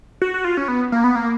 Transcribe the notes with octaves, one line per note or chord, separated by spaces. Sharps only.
F#4
F#4
F4
C#4
B3
A#3
B3
A#3